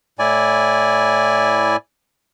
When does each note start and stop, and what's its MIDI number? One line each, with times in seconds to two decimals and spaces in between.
0.19 1.76 45
0.19 1.76 64
0.19 1.76 74
0.19 1.76 80